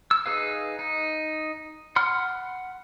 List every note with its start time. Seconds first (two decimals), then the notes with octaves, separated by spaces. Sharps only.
0.11 E6
0.26 D#4 G#4 B4 F5
0.79 D#4
1.96 F#5 B5 C6 F6